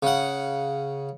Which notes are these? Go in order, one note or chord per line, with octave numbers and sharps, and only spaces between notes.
C#3 F#5